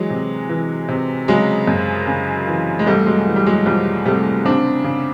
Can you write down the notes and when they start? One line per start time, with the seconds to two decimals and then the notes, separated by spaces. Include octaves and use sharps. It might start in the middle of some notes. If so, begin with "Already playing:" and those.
Already playing: E3 F#3 G#3
0.10 C3
0.49 E3
0.89 C3
1.28 C#3 F#3 G#3
1.67 F#2
2.07 C#3
2.47 E3
2.79 G#3
2.86 C2 G3 A3
3.06 F#3 G#3
3.27 E3
3.36 G3
3.46 F#3 G#3
3.66 C2 F3 G3
4.06 C3 G3 A3
4.45 C#3 C4 D4
4.84 C#3